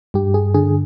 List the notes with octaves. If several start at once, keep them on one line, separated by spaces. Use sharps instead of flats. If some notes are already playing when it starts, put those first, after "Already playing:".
G2 G4
G#4
D3 G#4